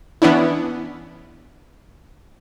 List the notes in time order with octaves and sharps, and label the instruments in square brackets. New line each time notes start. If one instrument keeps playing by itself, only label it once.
[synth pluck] E3 B3 C#4 D4 E4